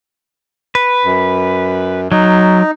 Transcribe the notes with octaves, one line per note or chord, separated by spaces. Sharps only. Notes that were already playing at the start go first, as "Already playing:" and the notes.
B4
F#2
F#3 D#4